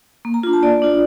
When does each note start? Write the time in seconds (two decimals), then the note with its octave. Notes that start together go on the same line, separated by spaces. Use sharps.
0.25 A#3
0.34 A#5
0.43 D4 F4
0.53 A5
0.63 A#3 D5
0.82 D4 F4